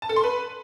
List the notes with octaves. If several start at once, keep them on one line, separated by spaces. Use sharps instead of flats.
A5
A4
C6
B4